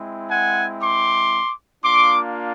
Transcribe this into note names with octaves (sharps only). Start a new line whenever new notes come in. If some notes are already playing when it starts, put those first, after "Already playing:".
Already playing: G#3 C4 E4
F#5 G#5
C6 D6
A#3 D4 F4 C6 D6